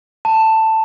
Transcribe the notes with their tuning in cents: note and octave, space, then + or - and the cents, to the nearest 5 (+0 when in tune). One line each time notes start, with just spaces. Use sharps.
A5 +10